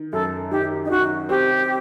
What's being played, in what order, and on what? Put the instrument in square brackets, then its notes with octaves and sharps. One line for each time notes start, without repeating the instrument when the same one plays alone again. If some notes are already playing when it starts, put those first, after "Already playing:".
Already playing: [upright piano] D#3
[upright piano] F#2 [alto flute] A4
[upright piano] D#3 [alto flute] G4
[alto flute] D#4
[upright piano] D#3 [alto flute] F#4
[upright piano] C4 [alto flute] G4